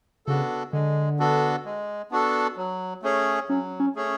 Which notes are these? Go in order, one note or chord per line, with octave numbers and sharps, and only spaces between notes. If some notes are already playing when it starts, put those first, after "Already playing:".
C#3 B3 D4 F#4 A4
D3 G#3
B3 D4 F#4 A4
G#3
B3 D4 F#4 A4
F#3
A3 C#4 G#4 C#5
F#3 C#4
C#4
A3 C#4 G#4 C#5